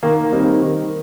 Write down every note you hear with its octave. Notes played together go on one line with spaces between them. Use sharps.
D#3 A#3
G3 C4 D#4 A#4
D#3